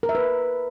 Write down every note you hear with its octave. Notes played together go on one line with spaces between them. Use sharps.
A#4
E5
B4